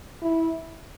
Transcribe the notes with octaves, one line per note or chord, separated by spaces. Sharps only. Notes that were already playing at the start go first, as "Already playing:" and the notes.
E4